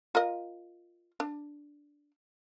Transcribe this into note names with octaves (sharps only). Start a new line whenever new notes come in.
F4 A#4 D#5
D4